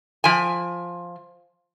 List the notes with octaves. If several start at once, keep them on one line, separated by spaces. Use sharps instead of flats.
F3 G#5